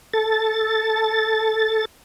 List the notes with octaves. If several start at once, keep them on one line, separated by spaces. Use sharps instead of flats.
A4 A6